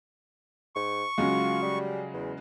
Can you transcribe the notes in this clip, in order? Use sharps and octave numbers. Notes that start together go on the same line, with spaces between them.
G#2 C#6
C#3 F#3 G#3 F4
G3
E2